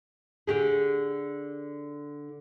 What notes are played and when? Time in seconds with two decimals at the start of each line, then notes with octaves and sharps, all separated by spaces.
0.47 D3 G4 G#4